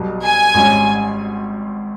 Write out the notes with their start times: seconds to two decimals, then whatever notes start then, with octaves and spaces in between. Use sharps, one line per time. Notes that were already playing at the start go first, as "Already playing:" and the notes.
Already playing: B1 B2 G3
0.23 G#5
0.55 G#1 G#2 G3 C#4